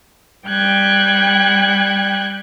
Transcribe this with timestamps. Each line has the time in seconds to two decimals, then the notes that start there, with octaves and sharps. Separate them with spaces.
0.47 G3 G5 F#6 G#6